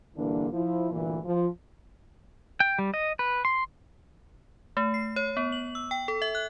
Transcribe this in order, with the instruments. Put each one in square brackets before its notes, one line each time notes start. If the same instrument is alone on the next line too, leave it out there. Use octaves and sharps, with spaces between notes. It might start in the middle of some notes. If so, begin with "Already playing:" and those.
[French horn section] G2 A#2 D3 E3 A#3 D4
F3 E4
D2 G2 A#2 E3
F3 F4
[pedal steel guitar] G5
G3
D#5
B4
C6
[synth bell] A3
C7
C#5
B3
F#7
E6
G5
A4
E5
F#6